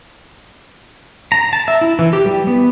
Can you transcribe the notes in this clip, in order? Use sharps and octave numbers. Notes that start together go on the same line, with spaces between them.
A#5
A5
E5
E4
E3
G4
G3
B3